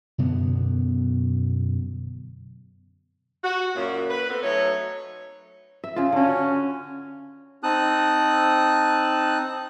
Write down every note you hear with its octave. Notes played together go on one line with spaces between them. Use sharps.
F#2 B2 D3 B3
F#4
F#2 A#2
B4
A3 B3 C4
F#3 A3 D#4 C#5
E5
C#3 F4
D3 C#4 F#4
C4 D#4 A5 D#6 F#6